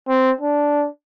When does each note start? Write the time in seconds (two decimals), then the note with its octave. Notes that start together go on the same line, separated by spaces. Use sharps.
0.08 C4
0.41 D4